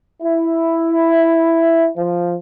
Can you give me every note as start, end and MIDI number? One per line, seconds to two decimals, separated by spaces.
0.22 1.88 64
1.97 2.34 53